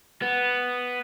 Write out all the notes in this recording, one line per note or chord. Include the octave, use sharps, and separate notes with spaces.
B3